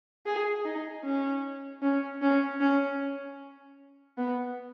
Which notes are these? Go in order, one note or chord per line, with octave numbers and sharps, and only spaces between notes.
G#4
D#4
C#4
C#4
C#4
C#4
B3